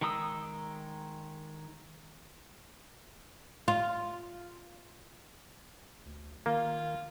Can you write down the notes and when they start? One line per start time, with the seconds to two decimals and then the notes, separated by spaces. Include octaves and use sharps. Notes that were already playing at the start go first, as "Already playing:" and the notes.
0.01 D#3 G#3 A#5 D#6 E6
3.68 F4
6.05 D2
6.46 D#3 A#3 F4